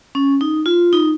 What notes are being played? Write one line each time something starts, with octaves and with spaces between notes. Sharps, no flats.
C#4
D#4
F4
D#4